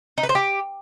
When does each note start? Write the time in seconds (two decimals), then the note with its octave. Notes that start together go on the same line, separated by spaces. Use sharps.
0.18 D#4
0.23 B4
0.29 C5
0.35 G4